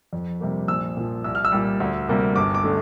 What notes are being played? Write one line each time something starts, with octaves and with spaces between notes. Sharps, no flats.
F2
C3 G3 A#3
A#1 E6
A#2 F3
C2 E6
F6
E6
A#2 G3
D2
C3 G3 A#3
G1 D6
D6
D3 A3